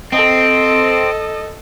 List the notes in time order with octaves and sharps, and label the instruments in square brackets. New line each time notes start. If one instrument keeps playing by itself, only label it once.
[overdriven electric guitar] C4 [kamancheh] A4 D#5